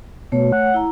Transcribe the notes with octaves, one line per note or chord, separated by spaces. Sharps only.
B2 A3 C#5
F#5
E4 A#5